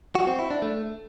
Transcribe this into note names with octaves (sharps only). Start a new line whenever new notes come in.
F#4
C4
E4
D4
A3